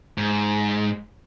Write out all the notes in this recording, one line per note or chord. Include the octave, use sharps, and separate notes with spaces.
G#2